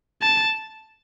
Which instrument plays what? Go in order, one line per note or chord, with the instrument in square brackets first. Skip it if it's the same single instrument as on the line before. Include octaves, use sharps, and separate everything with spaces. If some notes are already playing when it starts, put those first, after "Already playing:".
[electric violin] A5